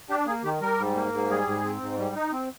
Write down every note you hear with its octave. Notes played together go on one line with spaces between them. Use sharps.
D4 G4
A#3 G#4
D#3 G4
G3 A#4
G#2
A#3
G#2
G3 G#4
G#2
C4
G#2
G3
D#4
C4